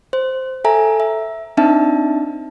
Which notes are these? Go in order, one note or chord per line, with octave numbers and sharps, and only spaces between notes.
C5
A4 E5 G#5 A#5
E5
C4 D4 D#4 E5 A5